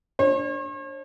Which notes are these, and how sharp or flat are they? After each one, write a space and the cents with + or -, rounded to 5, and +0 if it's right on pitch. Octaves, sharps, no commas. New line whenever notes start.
D4 +0 C#5 -45